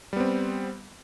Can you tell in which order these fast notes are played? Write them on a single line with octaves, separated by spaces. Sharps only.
G3 B3 C4